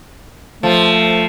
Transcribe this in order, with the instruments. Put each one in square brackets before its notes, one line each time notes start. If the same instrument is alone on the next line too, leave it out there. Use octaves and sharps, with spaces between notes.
[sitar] F3 [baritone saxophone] A3